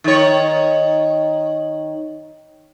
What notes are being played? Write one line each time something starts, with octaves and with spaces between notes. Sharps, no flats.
D#3 C#5